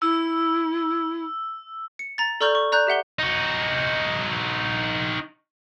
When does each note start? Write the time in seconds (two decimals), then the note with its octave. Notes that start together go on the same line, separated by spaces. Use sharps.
0.02 E4 E6
1.99 C#7
2.18 A#5 A6
2.41 A4 D5 A#5 C#6 F6 G6
2.55 C#6
2.72 D5 A#5 F#6 G6
2.87 G4 E5 F#5 G7
3.19 D#4 F#4